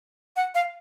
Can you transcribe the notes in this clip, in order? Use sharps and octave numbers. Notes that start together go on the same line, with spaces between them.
F#5
F5